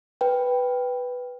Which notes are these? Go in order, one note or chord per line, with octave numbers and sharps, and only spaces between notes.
B4 G5